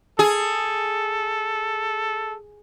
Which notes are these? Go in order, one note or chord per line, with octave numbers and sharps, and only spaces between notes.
G#4 A4